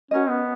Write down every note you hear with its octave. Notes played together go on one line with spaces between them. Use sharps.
C#4 F#4 A#4 D#5
B3